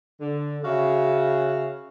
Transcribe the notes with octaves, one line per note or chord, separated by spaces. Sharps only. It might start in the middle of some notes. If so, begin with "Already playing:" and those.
D3
C#3 F#4 E5 F5